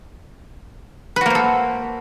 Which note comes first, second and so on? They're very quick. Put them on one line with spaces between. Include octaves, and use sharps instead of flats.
B4 F#4 A#3 C5 A4